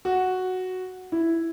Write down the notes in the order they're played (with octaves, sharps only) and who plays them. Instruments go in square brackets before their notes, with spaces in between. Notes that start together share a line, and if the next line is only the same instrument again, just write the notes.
[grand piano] F#4
E4